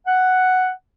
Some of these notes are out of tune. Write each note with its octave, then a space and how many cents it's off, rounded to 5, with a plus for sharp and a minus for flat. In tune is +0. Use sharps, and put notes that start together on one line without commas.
F#5 +5